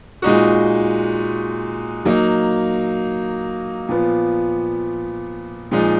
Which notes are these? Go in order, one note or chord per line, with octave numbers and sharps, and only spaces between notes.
A#2 G#3 D#4 F#4
F#3 A#3 D#4
A#2 F3 B3
A#2 F3 G#3 D#4